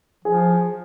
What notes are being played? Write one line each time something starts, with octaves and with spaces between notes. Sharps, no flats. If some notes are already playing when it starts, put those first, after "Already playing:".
F3 G#4